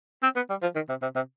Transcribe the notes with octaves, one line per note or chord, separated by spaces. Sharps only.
C4
B3
G3
F3
D#3
C3
C3
C3